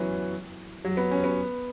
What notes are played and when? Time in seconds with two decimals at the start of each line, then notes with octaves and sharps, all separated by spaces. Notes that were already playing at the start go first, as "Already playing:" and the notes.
Already playing: E3 F#3 B3 C#4
0.85 F#3
0.97 B3
1.11 C#4
1.24 B3